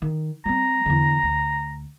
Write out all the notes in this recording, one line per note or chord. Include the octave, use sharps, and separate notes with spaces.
D#3
G3 C4 A#5
E2 D3
D2